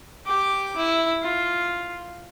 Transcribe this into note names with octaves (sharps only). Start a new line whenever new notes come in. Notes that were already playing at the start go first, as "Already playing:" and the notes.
G4 D6
E4
F4